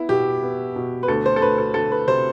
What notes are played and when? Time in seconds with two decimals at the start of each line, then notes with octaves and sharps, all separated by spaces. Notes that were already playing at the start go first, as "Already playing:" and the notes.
Already playing: B3 E4
0.09 B2 G4
0.43 B3
0.76 B2
1.03 B4
1.08 D2 A4
1.26 C5
1.36 A4
1.41 D2 B4
1.58 A4
1.74 D2 A4
1.92 B4
2.07 C3 C5